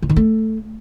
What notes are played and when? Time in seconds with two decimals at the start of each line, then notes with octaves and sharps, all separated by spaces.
0.02 E3
0.09 D#3
0.16 A3